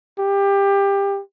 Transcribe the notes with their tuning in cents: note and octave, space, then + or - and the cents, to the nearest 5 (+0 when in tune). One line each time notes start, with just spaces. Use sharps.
G4 +20